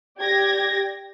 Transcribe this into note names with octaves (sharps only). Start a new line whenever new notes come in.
G4 D5 G#6 A#6